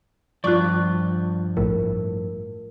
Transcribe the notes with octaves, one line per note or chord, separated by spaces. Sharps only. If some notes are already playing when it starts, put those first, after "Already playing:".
G2 F3 F4 D5 C#6 F#6
A#1 A2 A#4